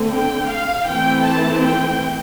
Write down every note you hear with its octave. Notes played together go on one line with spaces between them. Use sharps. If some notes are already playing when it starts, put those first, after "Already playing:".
Already playing: D3 A3 C4
G5
F5
E3 A3 C4 G5
A5
G5